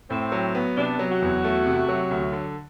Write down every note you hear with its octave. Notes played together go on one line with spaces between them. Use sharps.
A2 C4
F#3
B3
C3 D4
F#3
F#4
E2
A3
C3
F#3
D2
D3